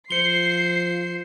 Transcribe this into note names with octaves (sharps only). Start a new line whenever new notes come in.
F3 C5 C7 C#7 G7